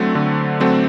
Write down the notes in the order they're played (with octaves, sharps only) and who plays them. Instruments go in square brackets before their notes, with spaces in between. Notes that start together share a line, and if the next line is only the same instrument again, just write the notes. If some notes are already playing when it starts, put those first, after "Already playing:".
Already playing: [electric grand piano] D3 F#3 A3 C4
D3
F#3 A3 C4